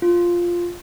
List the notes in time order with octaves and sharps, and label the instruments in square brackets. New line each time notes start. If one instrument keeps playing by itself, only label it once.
[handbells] F4